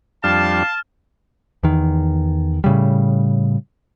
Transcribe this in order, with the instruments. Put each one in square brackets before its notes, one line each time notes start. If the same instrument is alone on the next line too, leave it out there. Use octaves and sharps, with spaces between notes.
[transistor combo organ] F2 G3 D4 [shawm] F5 [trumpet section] A5 [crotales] F6
[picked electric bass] E2 D#3
A2 C#3 G3